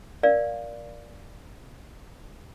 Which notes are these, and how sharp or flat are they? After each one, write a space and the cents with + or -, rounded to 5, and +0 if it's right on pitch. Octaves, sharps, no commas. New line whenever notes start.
A#4 +15 D5 +0 F5 +0